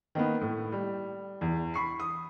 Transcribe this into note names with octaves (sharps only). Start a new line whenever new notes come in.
D#3 A#3 B3
A2
G3
E2
B5 C#6 C7
D#6